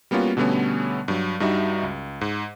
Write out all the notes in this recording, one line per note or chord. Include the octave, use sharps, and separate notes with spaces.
G3 A#3 B3 C#4 F4 F#4
B2 D3 G3 A3 B3 C#4
G2 F#3
G2 G3 D#4 F#4 E5
C#2
G#2